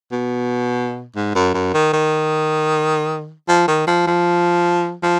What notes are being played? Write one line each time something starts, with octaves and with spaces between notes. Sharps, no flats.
B2
G#2
F#2
F#2
D#3
D#3
F3
D#3
F3
F3
F3